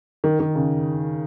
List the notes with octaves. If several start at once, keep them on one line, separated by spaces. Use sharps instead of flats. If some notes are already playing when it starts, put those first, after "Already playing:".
D#3
D#3
C#3